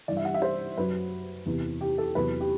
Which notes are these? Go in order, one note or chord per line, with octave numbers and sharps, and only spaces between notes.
G2 E3 D5
E5
F#5
E5
C5
F#2 F#3 B4
E2 C3 E3
G4
A4
E2 C3 F#3 B4
G4